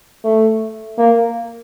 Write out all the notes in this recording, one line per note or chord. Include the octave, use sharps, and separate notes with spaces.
A3
A#3